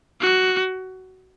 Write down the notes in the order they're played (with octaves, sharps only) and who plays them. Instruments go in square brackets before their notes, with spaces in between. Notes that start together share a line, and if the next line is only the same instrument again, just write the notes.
[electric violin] F#4